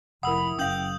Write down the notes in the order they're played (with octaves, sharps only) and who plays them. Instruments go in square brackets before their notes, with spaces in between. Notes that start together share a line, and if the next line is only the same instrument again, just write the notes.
[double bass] F1 E4 [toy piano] A#4 F#5 [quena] B5 [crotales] D#6 E6
[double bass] F#1 [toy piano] C#4 F5 [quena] G5 [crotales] D#6 G6 F#7